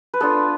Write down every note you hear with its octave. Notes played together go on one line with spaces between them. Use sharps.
B4
B3 D4 F4 A4